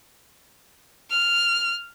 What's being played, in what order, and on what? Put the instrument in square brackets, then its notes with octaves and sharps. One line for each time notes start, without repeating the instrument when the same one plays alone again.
[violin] F6